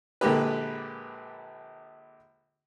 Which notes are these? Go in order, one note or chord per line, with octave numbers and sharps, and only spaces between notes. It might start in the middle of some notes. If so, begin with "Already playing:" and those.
A#1 D3 G#3 A#3 G4 B4